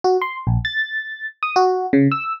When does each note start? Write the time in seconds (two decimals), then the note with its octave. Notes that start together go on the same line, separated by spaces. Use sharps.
0.04 F#4
0.22 C6
0.47 A#1
0.65 A6
1.43 D#6
1.56 F#4
1.93 C#3
2.12 E6